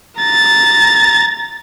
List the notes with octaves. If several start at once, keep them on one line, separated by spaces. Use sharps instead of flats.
A#5 A6